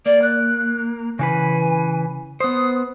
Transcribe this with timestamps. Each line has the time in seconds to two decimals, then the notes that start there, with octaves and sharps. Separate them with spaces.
0.06 A#3 D5
0.22 F#6
1.19 C#3 E3 B4 G#5
2.40 B3 C5 D#6